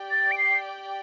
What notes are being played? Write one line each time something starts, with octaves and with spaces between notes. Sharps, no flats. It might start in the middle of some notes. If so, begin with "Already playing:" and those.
Already playing: G4 D5 G5
A6
D7
C7